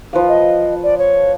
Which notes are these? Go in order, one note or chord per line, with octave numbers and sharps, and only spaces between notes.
F3 B4 F5
D#5
D5
C#5